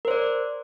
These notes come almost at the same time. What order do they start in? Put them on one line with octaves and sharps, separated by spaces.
A#4 C5 D5